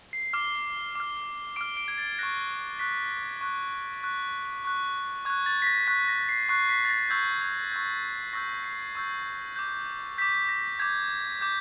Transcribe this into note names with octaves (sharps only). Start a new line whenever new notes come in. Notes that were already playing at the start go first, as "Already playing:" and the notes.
C7
D6 F6
D6 F6
D6 F6 D7
D7
G#6
A6
C#6 F#6 A#6
C#6 F#6 B6
C#6 F#6
C#6 F#6
C#6 F#6
C#6 F#6 G#6
A6
B6
A#6
C#6 F#6 B6
A#6
C7
C#6 F#6 C7
B6
A6
A#6
C#6 E6 G6 G#6
G#6
C#6 E6 G6
C#6 E6 G6 A#6
C7
C#6 E6 G6
D6 G6
D6 G6 B6
A#6
D6 G6 G#6
D6 G6